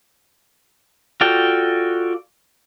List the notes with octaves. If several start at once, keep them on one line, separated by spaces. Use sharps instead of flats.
F4 F#4 A4 D5 G5